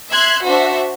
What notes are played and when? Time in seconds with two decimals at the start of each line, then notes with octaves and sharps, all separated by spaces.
0.10 E5 C6 F#6 G#6
0.45 D4 F#4 C5 E5